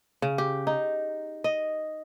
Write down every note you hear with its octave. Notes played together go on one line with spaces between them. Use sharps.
C#3
G4
D#4
D#5